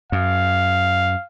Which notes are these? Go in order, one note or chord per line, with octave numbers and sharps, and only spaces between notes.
F#2 F5